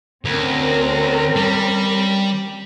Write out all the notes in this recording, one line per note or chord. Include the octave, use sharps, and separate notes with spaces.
D2 C4 C#4 A#4
G3